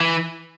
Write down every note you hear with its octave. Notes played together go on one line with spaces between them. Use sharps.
E3